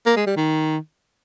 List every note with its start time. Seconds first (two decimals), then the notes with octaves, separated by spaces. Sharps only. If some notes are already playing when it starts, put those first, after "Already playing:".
0.06 A#3
0.16 G#3
0.27 G3
0.37 D#3